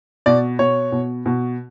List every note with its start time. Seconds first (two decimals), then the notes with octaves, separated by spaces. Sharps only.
0.26 B2 D5
0.59 B2 C#5
0.92 B2
1.26 B2